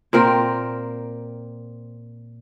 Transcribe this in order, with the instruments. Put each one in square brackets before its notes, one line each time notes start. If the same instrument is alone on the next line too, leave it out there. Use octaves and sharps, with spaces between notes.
[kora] A#2 C4 A#4 G5